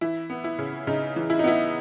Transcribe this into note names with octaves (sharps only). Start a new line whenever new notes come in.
E3 E4
B3
E4
C#3
C#3 D#4
E3
E4
D#4
B3 E4